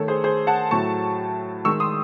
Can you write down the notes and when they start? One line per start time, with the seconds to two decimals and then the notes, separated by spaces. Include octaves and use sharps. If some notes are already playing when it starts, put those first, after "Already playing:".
Already playing: D#3 A3 A4 C#5
0.08 G#4 C5
0.24 G#4 C5
0.47 F#5 A5
0.71 A2 F#3 A3 A5 C#6
1.65 D#3 G#3 C#6 E6
1.80 C6 D#6